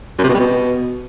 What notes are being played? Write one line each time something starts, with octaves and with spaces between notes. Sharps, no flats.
F#2
C3
B2
G3
B2